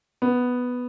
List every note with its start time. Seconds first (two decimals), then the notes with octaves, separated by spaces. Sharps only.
0.22 B3